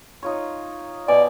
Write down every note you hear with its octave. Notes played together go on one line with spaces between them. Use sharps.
D#4 F4 C#5
B2 D5 G#5 D6